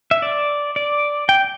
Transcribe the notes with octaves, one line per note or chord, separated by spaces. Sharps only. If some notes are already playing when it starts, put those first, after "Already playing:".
E5
D5
D5
G5